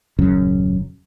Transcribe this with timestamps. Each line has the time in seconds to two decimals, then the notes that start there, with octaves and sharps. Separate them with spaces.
0.19 D#1 F#2 C#3